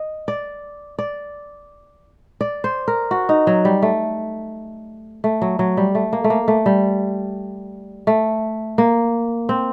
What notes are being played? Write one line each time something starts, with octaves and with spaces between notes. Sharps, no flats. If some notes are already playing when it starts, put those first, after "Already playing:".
Already playing: D#5
D5
D5
D5
C5
A#4
F#4
D#4
F#3
G3
A3
A3
F#3
F#3
G3
A3
A#3
A3
A#3
A3
G3
A3
A#3
C4